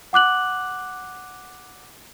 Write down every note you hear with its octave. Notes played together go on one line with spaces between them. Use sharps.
F#5 D6 F#6 F#7